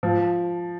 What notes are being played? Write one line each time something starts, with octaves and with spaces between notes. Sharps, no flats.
F3